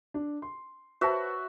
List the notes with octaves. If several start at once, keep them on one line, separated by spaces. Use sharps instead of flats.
D4
C6
F#4 B4 C5 E5 A5